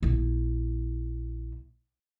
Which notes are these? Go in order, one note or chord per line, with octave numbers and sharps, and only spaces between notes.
A#1 E4